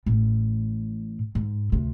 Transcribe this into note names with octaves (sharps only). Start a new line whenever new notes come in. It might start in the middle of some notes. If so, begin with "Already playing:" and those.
A1 A2
G#2
D2 C3